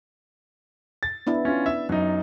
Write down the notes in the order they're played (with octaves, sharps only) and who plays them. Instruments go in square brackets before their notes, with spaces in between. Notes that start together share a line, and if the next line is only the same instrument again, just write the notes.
[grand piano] A6
[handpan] B3 D4 E4
[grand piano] C#4 F4
E5
F#2 D#4